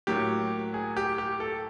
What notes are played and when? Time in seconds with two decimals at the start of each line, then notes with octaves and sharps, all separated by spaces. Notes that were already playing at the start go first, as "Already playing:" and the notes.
0.07 A2 F#3 A#3 G4
0.74 G#4
0.97 G4
1.18 G4
1.40 A4